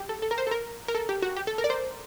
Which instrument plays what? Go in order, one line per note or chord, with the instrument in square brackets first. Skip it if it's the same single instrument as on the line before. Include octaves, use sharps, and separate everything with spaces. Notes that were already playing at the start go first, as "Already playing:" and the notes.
Already playing: [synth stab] G4
A4
A4
A#4
C5
A4
A#4
A#4
A4
G4
F#4
G4
A4
A#4
D5
C5